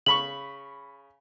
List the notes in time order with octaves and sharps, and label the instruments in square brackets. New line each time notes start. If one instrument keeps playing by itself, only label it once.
[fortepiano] C#3 B5 C#6 [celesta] F#7